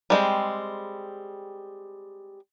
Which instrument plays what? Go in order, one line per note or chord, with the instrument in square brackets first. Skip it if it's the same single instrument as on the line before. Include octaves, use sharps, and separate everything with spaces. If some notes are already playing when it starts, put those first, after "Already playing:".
[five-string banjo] G3 G#3 C4